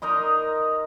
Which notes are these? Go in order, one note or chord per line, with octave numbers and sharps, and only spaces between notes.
D#4 A#4 D#5 C6